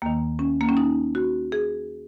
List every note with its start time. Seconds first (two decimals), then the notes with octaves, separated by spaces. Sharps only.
0.02 D#2 D#3 A#3
0.39 C#4
0.61 A#3
0.69 C#4
0.77 D#4
1.15 F#4
1.52 G#4